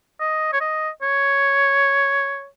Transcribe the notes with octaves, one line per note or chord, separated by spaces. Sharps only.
D#5
C#5
D#5
C#5